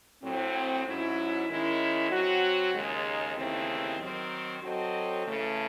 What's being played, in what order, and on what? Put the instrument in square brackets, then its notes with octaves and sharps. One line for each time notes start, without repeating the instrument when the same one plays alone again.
[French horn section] A2 F#3 C4
G#2 F#3 C#4 E4
D#3 G#3 C#4 E4
F#3 C4 F#4
D#2 C#3 G#3 D#4
D#2 C#3 E3 A3 C4
D#3 F#3 C4
F#3 C4 F#4 A4 D#5
C#3 E3 A3